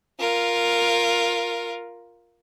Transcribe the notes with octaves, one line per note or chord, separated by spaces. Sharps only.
F4 A#4